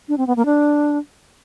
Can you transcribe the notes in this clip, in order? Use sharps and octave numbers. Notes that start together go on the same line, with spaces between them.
D4
C4
B3
A#3
D4